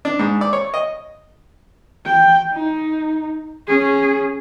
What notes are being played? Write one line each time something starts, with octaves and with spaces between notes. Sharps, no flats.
D4
G#2
D5
C#5
D#5
G5
D#4
C#4 G#4